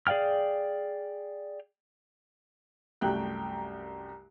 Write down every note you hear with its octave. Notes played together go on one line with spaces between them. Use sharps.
G#4 D5 F5 G5 F6
C2 F#2 A3 G5 F#6